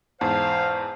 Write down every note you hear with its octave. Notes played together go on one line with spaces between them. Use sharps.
E2 G#2 C5 F5 A5